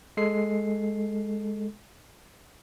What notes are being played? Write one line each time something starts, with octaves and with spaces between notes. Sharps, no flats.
G#3 A4 C7